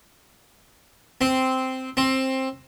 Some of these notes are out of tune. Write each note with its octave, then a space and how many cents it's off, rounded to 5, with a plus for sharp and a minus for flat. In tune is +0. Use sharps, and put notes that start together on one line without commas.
C4 -5
C4 +15